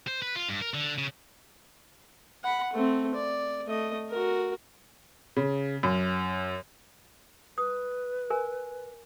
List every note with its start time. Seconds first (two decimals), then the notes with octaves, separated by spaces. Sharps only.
0.07 C5
0.22 B4
0.36 F4
0.49 G2
0.62 A#4
0.74 D3
0.98 C#3
2.44 F#5 B5
2.73 A3 C4
3.15 D5
3.67 A3 D#5
4.09 F#4 A#4
5.36 C#3
5.83 F#2
7.58 B4 D#6
8.30 A#4 G#5